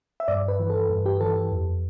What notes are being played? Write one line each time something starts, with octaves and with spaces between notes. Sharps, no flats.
E5
G2 D5
B4
E3
A4
G2
G4
E3 A4
F2